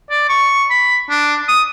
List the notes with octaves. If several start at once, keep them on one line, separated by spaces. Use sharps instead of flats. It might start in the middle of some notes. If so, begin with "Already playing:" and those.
D5
C#6
B5
D4
D#6